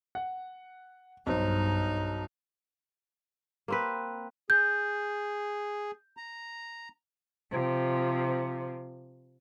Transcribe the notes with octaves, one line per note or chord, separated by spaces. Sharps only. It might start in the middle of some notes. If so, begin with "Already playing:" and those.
F#5
B1 G2 D#4 C5
A#3 C4 B4
G#4 G6
A#5
C3 F3